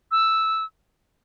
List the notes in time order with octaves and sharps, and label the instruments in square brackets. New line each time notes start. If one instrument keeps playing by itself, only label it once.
[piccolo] E6